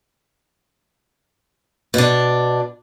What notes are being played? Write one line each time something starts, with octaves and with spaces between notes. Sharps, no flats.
B2 D4